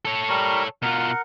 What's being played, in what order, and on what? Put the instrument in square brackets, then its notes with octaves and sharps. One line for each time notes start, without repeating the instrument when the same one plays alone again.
[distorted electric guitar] A4 C#5
[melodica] G3 A#4 C#6
[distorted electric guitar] B2 F4 [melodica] A#4 F#5